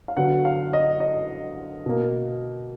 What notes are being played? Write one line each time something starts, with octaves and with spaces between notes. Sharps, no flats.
F5
D3 F#3 B3 F#5
F5
D#5
D#5
B2 A#3